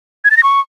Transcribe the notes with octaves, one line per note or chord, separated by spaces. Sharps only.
G#6
A6
A#6
C#6